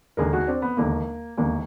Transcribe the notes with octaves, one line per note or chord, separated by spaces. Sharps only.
E1 D#2 D3 G#4 A#4
F#4 G#4
C4 D4
B3
E1 D#2 D3 A#3
E1 D#2 D3 A#3